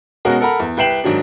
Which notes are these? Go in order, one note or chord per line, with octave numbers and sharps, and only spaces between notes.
B2 G#3 C#4 F#4 A#4
A4 A#4 F#5 A#5 B5
E2
C2 B4 G5 C7 E7 F#7
G#2 D#3 F#3 D4